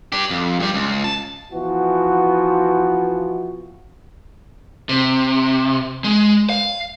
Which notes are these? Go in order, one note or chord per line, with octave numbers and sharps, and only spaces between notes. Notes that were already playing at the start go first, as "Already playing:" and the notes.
D4 G4
F2
G2 G3
C#2
A5
E3 F3 B3 F#4
C3
G#3
F5